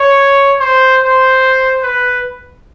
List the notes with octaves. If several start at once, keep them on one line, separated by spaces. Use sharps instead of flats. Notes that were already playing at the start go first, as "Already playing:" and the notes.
Already playing: C#5
C5
C5
B4